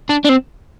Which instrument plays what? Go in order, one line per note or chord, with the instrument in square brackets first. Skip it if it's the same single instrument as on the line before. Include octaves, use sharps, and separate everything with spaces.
[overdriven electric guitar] D4
D4
C4